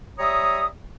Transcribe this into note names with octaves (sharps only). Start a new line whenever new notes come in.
G3 C#5 E5 A#5 D#6